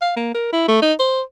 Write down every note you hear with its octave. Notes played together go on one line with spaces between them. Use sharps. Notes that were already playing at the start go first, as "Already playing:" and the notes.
F5
A#3
A#4
E4
A3
D#4
C5